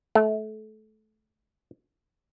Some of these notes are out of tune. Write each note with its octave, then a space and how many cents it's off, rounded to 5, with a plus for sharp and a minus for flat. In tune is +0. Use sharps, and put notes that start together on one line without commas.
A3 -25